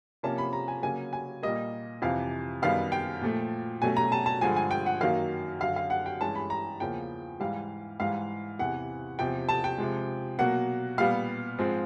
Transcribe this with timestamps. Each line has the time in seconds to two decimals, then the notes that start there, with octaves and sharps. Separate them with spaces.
0.23 C3 F3 A#3 C#4 A5
0.38 B5
0.53 A#5
0.68 G#5
0.83 C#3 F#3 A#3 C#4 G#5
1.13 G#5
1.43 A#2 G3 A#3 D#5
2.02 F2 C3 E3 F5
2.62 F#2 D#3 G3 B3 F5
2.92 G5
3.21 A#2 F3 A3
3.82 B2 F#3 A3 C#4 G#5
3.97 A#5
4.12 A5
4.26 A5
4.41 G2 D3 F3 G#3 G#5
4.57 G#5
4.71 G5
4.86 F#5
5.01 F#2 D#3 F#3 A#3 F5
5.61 F#2 D3 F#3 F5
5.76 F5
5.90 F#5
6.06 G5
6.21 G2 E3 G#3 C#4 A5
6.35 B5
6.50 A#5
6.80 E2 C#3 F3 A#3 C#4 G5
7.40 G#2 E3 G3 F5
8.00 G#2 E3 G3 F5
8.59 E2 C3 E3 F#5
9.19 E2 C3 F3 G5
9.49 A5
9.64 G5
9.78 C3 F3 G#3
10.39 B2 F#3 A#3 F#5
10.98 A#2 G3 B3 F5
11.59 G#2 F3 G#3 C4